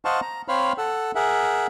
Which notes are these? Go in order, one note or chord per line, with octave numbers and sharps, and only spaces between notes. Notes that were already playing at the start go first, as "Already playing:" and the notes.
C5 D#5 F5 F#5 A5 C#6
A#5
C4 C5 C#5 F5 B5 F6
A4 F#5 E6
G#4 A#4 E5 F#5